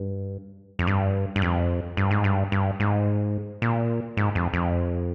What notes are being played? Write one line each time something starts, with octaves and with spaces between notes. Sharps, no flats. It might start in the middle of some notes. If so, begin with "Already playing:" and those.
Already playing: G2
F2
G2
G2
F2
G2
G#2
G2
G2
G#2
A#2
G#2
F2
F2